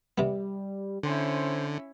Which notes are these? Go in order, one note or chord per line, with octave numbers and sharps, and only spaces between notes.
C3 G3 B3
D3 C#4 E4 C5